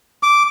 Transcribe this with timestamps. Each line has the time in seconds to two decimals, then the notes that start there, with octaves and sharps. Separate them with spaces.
0.23 D6